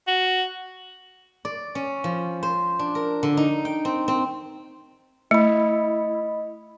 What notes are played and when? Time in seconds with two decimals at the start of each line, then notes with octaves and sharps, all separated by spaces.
0.08 F#4
1.45 D5
1.75 C#4
2.04 F3
2.43 C5
2.79 D4
2.95 A#4
3.23 D3
3.37 D#4
3.65 G5
3.85 C4
4.08 C4
5.31 A3 E4 D#5 B5